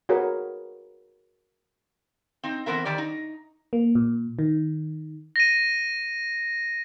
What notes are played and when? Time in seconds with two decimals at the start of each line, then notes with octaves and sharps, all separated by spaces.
0.09 F#4 G#4 A#4 B4 C#5
2.43 C4 D#4
2.66 E3 B3 C4 A#4 E5
2.85 D#3 G3 G4 D5
2.98 D#4
3.73 A#3
3.95 A#2
4.39 D#3
5.36 A#6 D#7